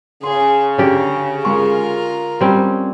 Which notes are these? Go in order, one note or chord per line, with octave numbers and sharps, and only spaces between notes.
C#3 G#4 C6
D3 C#4 G4 C#5 A#5
G#3 F4 A#4 C#6
G3 C4 C#4